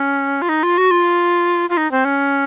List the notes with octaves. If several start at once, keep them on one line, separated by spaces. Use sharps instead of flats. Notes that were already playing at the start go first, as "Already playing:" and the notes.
Already playing: C#4
F4
D#4
F4
F#4
F4
F4
D#4
C4
C#4